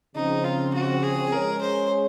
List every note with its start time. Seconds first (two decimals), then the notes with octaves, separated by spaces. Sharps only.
0.15 C#3 F3 C4 D#4
0.44 F4
0.74 F#4
1.03 G#4
1.32 G#3 C#4 G#4 A#4 C#5
1.62 C5